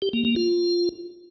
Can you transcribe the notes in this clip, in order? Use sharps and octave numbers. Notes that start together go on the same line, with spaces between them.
G4
A#3
A#3
F4